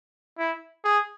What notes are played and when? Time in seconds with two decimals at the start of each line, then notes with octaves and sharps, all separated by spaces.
0.38 E4
0.84 G#4